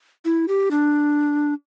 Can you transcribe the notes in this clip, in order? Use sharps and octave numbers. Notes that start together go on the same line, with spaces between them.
E4
G4
D4